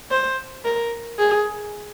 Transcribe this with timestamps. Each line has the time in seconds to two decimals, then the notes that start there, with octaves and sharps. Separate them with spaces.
0.11 C5
0.65 A#4
1.19 G#4